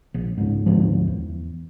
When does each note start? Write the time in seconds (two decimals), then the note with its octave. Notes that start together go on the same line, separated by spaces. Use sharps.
0.14 A#1
0.38 C#2 G#2
0.66 G#1 D2 G#2 F3
1.07 E2